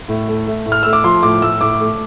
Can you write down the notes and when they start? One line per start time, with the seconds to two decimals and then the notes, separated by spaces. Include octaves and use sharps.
0.08 A2
0.28 A3
0.47 A3
0.66 A2
0.72 F6
0.83 A3 E6
0.93 D6
1.04 F3 C6
1.23 A2 D6
1.42 A2 E6
1.61 A2 D6
1.81 A3